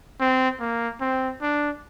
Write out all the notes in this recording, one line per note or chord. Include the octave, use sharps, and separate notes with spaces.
C4
A#3
C4
D4